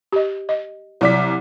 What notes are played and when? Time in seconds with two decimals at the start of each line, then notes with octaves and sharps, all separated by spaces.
0.12 G4 D#5
0.49 D#5
1.01 C2 F#3 D5 D6 B6